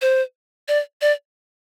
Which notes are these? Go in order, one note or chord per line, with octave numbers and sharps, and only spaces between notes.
C5
D5
D5